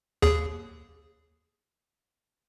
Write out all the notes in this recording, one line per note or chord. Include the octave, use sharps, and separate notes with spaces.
D#2 G#4